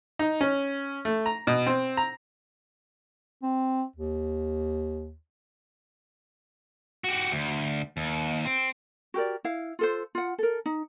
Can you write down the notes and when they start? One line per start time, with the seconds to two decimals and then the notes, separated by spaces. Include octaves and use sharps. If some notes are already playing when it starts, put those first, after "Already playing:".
0.19 D#4
0.41 C#4
1.05 A3
1.26 A#5
1.47 B2
1.66 C4
1.97 A#5
3.43 C4
3.96 D#2
7.04 F#4 G4
7.32 D2
7.97 D#2
8.45 C4
9.14 F#4 G4 A#4 D5
9.44 E4 F5
9.79 F4 A4 C5
10.15 F4 F#5
10.38 A4 A#4
10.66 D#4